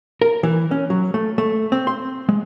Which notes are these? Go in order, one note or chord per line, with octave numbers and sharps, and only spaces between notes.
A#4
E3
C#4
F#3
A3
A3
C4
C6
G#3